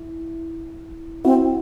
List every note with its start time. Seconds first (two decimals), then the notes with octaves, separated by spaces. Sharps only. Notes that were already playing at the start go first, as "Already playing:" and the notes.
Already playing: E4
1.25 C4 E4 F#4